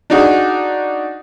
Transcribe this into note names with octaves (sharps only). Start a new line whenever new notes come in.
D4 D#4 F#4 G#4